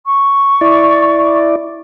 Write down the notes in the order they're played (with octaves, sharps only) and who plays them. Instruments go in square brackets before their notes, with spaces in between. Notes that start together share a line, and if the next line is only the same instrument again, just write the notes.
[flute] C#6
[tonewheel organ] E4 D5